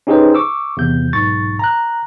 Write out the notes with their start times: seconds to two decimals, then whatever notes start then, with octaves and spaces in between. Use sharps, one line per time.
0.07 C#4 D#4 G4 G#4 B4 C5
0.34 C#6 D6 E6
0.77 E2 C3 G6
1.13 B1 G#2 C#6 A6
1.59 A#5 F#6